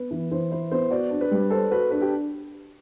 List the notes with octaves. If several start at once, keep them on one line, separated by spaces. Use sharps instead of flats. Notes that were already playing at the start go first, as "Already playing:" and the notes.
Already playing: B3 B4
E3
E3 C5
E4 C5
B3 C5
F#4 D5
D4
B4
G3
A4 C5
F#4 B4
D4 B4
G4